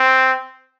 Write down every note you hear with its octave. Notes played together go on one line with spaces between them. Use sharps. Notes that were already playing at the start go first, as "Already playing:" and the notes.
Already playing: C4